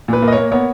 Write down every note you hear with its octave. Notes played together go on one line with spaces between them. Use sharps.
A#2 B4
A#3
D#5
A#3 C#5
B3 C#5